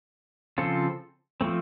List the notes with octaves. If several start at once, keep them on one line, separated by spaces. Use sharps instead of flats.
C#3 F3 C4 F4 A4
F3 A3 C4